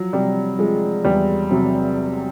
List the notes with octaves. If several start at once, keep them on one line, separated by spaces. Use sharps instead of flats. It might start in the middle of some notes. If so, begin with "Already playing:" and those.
Already playing: F3 F#3
C3 G3
F3 G#3
E2 G3
C3 F#3